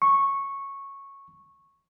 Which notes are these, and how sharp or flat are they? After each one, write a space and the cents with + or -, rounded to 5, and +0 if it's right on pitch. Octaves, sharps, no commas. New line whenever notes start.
C#6 -10